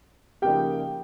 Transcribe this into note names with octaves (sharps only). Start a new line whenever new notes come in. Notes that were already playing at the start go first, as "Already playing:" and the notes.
C#3 F3 A#3 D#4 G4 G5